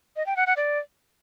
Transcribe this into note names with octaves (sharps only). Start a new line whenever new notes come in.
D#5
G5
F#5
F#5
D5